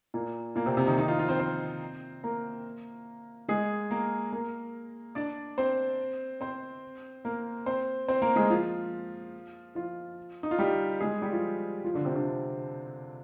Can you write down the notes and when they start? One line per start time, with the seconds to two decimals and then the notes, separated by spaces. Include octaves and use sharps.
0.14 A#2 A#3
0.55 A#2 A#3
0.66 C3 C4
0.77 C3 C4
0.87 D#3 D#4
0.98 D#3 D#4
1.08 F3 F4
1.19 F3 F4
1.29 C4 C5
1.39 C4 C5
2.24 A#3 A#4
3.49 G#3 G#4
3.91 A#3 A#4
4.32 A#3 A#4
5.15 D4 D5
5.58 C4 C5
6.41 C4 C5
7.25 A#3 A#4
7.66 C4 C5
8.08 C4 C5
8.22 A#3 A#4
8.36 G#3 G#4
8.50 F3 F4
9.75 F3 F4
10.43 D#4
10.51 F4
10.59 G3 G4
11.00 G#3 G#4
11.22 G3 G4
11.32 F3 F4
11.84 F3 F4
11.94 D3 D4
12.05 C3 C4
12.15 D3 D4